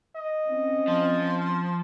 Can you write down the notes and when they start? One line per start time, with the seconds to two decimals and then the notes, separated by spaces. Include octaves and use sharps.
0.16 D#5
0.49 C4 C#4
0.88 F3 C6